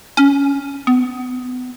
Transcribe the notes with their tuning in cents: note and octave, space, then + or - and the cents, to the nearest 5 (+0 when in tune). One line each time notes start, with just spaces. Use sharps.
C#4 +10
B3 +30